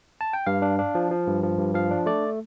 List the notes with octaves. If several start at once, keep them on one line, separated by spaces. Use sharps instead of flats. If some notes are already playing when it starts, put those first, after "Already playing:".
A5
G5
G2 F5
D4
D4
F3
F3
G2
F3
G2
F3 F5
D4
A3 D5